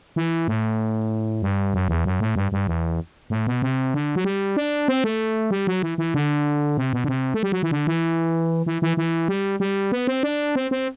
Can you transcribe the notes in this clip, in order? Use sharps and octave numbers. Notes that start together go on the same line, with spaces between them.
E3
A2
G2
F#2
E2
F#2
A2
G2
G2
E2
A2
B2
C3
D3
F#3
G3
D4
C4
A3
G3
F#3
E3
E3
D3
C3
B2
D3
C3
A3
G3
F#3
E3
D3
E3
E3
E3
E3
G3
G3
B3
C4
D4
C4
C4